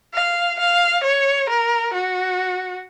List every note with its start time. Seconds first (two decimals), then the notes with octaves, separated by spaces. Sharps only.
0.14 F5
0.59 F5
1.04 C#5
1.49 A#4
1.93 F#4